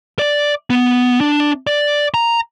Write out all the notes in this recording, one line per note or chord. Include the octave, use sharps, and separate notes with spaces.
D5
B3
D4
D5
A#5